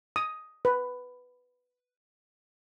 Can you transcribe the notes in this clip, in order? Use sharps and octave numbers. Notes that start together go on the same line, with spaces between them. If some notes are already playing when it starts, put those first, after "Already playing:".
D#6
B4